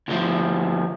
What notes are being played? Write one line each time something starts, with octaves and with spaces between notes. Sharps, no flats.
D2 F3